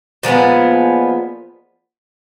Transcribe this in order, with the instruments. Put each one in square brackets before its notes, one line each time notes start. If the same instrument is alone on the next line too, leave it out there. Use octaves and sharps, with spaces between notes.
[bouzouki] A#2 F3 G#3 B3